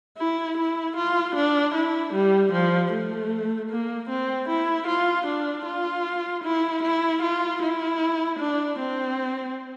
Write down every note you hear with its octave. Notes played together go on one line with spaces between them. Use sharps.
E4
E4
F4
D4
E4
G3
F3
A3
A#3
C4
E4
F4
D4
F4
E4
E4
F4
E4
D4
C4